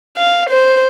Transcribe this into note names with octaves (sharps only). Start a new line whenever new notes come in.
F5
C5